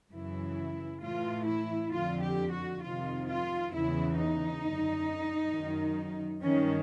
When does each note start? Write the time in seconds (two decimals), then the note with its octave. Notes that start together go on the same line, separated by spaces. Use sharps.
0.13 F#2 C#3 E3 E4
1.02 A2 E3 F4
1.47 E4
1.92 F2 D3 F4
2.22 G4
2.52 F#4
2.82 F2 C3 D#3 F4
3.27 F4
3.73 E2 C#3 E3 E4
4.17 D#4
4.62 F#2 D3
5.52 F#2 D#3
6.43 G2 D#3 C#4